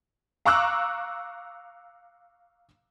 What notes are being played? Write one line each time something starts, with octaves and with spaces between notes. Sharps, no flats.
F5 A#5 C#6 D6 E6 F#6